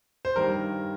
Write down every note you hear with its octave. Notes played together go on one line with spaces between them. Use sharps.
C5
G2 D#3 G3 A#4